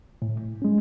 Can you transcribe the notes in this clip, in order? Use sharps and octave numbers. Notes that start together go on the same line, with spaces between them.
A2
G#3 C#4